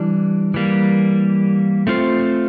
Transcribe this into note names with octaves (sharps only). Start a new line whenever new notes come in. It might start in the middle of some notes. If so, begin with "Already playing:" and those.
Already playing: E3 G3 D4
E3 G3 A#3
A3 C4 F4 C5